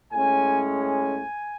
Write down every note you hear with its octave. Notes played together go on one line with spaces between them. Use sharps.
A2 G#3 C#4 G#5
G#5